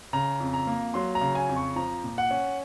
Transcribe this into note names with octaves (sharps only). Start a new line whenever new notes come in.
C#3 A#5
F2
A#5
A#3
F#3 C6
A#5
C#3
G#5
F2
C#6
F3 A#5
A#2
F#5
C#4